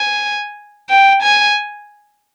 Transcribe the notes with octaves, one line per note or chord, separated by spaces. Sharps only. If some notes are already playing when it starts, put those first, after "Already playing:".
Already playing: G#5
G5
G#5